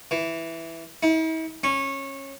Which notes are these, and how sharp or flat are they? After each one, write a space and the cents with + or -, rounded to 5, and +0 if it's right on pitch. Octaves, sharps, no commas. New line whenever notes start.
E3 +0
E4 -45
C#4 -20